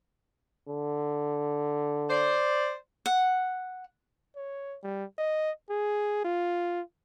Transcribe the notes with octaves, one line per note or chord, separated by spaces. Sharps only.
D3
C5 D5
F#5
C#5
G3
D#5
G#4
F4